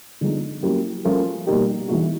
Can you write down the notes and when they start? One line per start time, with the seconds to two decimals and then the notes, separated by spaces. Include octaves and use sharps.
0.21 D3 F3 G#3 B3 D#4
0.63 F#3 A#3 C#4 E4 G4
1.05 F3 A3 C#4 F4 A#4
1.47 B2 G3 A#3 D#4 G4
1.88 E3 G#3 B3 D#4 F#4